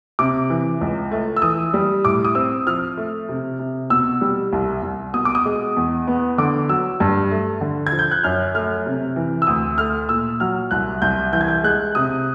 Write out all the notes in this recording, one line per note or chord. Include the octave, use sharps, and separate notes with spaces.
C3 D6
E3
C#2
A3
E6
E3 D#6
G3
A2 D6
D#6
C4 E6
F3 F6
A3
C3
C3
B2 E6
G3
C2
C2
B2 D#6
D6
D#6
G#3
E2
B3
D3 D6
F#3 E6
G2
A3
D3
G#6
F3
G6
F#6
F#2 F6
A3 F6
C3
E3
E6
D2 D#6
A3 F6
A#2 E6
F#3 F6
C2 F#6
C2 G6
E3 G6
G#6
G6
G#3 F#6
C3 D#6